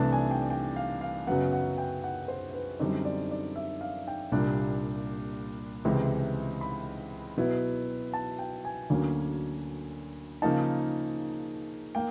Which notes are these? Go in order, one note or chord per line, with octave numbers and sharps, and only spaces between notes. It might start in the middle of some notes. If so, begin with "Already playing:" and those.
Already playing: C2 C3 E3 A3 D4 A5
G#5
G5
G5
F5
F5
F#2 C#3 F#3 B3 F#5
F#5
G5
F#5
C5
B4
F#2 D3 G3 C4 D#4
D5
D5
E5
F5
G5
C2 A#2 G3 A#3 D4
C#2 C3 E3 G#3 C4
B5
B2 F#3 B3 E4
A5
G5
G#5
D2 D3 F#3 A#3 C#4
C#3 F3 A#3 D#4 A5
A#3 G5